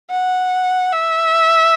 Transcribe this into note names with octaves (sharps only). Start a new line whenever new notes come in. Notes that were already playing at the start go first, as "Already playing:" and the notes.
F#5
E5